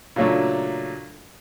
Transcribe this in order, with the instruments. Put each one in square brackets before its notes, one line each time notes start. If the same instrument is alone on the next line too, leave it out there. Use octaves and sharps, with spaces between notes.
[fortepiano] A#2 C#3 F#3 A3 D4